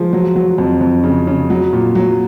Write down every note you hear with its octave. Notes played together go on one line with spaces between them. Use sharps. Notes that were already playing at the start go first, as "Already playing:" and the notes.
Already playing: F3 G#3
F#3
F#3
F2
F2
C#3
C#3
F#3
A#2
F#3